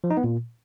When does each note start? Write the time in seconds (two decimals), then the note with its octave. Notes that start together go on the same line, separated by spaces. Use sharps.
0.04 F3
0.10 D#4
0.17 B3
0.24 A#2